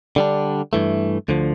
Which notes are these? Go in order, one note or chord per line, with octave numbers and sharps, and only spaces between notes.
D3 G3 D4
G2 E3 A3
D2 D3 F3